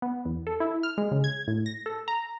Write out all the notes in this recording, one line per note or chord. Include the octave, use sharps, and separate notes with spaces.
B3
E2
A4
E4
F6
G#3
C#3
G#6
A2
A#6
A4
A#5